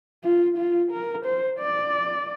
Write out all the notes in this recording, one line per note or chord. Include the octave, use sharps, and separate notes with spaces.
F4
F4
A#4
C5
D5